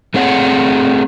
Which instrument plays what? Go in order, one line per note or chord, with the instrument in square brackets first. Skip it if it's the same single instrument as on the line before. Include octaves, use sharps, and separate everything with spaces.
[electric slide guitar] A3 C4 G#4 C#5 F#5